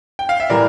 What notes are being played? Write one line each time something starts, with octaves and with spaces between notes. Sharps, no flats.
G5
F5
E5
A2 E3 G3 A#4 D5